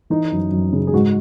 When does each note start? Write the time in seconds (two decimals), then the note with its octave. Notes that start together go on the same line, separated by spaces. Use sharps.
0.10 E3 D#4
0.32 F#2
0.51 F#2
0.73 C#3
0.87 G#4
0.94 G#2 F#4